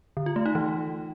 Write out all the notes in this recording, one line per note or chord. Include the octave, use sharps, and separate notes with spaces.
D3
F4
A3
D#4
E3